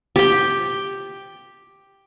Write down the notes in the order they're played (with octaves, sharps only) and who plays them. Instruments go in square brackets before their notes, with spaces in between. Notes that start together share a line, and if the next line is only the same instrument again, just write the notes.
[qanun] G4 G5